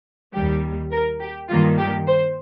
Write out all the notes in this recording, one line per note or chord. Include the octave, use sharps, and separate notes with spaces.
D#2 D#3 G3 G4
A#4
G4
G2 D#3 A#3 F4
G4
C5